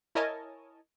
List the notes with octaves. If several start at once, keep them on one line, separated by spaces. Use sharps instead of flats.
E4 A#4 C#5 D#5 G#5 A5